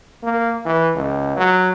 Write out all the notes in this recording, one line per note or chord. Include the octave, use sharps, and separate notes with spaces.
A#3
E3
C#2
F#3